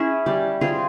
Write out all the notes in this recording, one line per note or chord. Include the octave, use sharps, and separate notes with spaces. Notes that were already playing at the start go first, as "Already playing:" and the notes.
Already playing: C#4 E4 G#4
G3
C4 F4 G#4